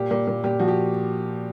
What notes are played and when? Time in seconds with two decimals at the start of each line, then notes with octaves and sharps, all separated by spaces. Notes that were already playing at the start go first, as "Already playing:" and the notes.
Already playing: A#2 G4
0.11 A#2
0.27 A#2
0.44 A#2 G4
0.59 F3 F#4
0.68 G4